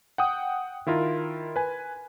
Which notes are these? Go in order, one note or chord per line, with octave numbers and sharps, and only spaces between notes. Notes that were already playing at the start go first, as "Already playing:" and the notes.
F#5 G5 D#6
D#3 E4 F4 A#4
B4 G#5